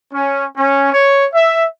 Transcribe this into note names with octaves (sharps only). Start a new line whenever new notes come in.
C#4
C#4
C#5
E5